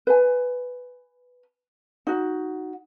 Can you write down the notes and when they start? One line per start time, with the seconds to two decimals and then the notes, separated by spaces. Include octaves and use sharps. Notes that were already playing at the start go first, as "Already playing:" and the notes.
0.07 B4 G#5
2.07 D#4 F#4